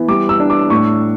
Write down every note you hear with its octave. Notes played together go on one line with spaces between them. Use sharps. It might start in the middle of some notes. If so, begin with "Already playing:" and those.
Already playing: E3 B3
G3 D6
E6
D4
D6
A2 C#6